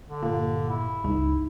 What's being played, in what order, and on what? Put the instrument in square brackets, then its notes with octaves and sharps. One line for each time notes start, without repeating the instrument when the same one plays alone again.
[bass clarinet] D3
[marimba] G2 F5 [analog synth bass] A#2
[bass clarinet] E4
[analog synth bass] C#2 [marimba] D#4